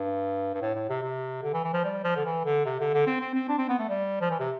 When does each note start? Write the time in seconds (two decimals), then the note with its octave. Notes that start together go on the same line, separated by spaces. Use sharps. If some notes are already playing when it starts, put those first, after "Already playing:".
Already playing: G2
0.54 G2
0.62 A2
0.75 A2
0.89 C3
1.02 C3
1.43 D3
1.53 E3
1.64 E3
1.73 F3
1.84 G3
2.04 F3
2.16 D3
2.25 E3
2.45 D3
2.65 C3
2.80 D3
2.94 D3
3.07 C4
3.20 C4
3.34 C4
3.49 D4
3.58 C4
3.69 B3
3.79 A3
3.89 G3
4.21 F3
4.30 E3
4.40 C3